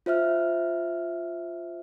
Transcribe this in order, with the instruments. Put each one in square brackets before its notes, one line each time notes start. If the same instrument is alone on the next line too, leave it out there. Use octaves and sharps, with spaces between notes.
[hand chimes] F4 C5 E5 F6